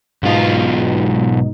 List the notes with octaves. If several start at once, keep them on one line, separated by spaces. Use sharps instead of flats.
B1 G#2 B2 D#4 F4